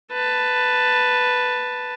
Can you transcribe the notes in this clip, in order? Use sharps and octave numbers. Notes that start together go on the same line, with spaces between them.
B4 A5